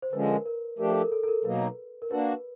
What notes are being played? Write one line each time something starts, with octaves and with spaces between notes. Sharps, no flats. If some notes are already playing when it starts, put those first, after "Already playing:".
C5
D3 F3 G#3 C#4 B4
A#4
A#4
F3 A3 D4 G4 A#4
A4
A#4
A4
A4
A#4
B2 F#3 A#3 D#4 B4
A#4
A#3 D4 F#4 B4